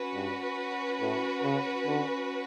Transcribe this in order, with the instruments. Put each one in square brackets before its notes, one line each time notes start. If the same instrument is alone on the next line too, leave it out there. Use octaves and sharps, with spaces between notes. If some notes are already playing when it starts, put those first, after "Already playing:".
Already playing: [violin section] C#4 F#4 B4
[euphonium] G2
A2
C#3
D3